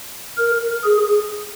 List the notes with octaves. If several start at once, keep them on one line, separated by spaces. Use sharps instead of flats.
A#4
G#4